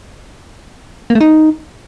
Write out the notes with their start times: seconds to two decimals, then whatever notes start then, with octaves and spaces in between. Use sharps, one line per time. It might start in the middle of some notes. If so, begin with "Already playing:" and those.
1.10 A#3
1.15 A3
1.21 D#4